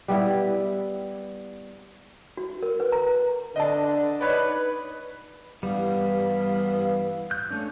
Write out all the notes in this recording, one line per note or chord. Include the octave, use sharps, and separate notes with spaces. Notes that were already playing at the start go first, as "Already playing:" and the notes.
G3 B3 E4
F#4
A#4
B4
A#5
D3 D4 D#5 A5
D#4 B4 C#5 D5
G2 E3 G3 B3 F5
F#6 G6
A3 C#4 D4